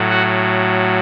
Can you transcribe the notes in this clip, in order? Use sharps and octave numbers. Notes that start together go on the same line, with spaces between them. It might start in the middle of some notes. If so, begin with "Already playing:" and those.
Already playing: A2 F#3
F#4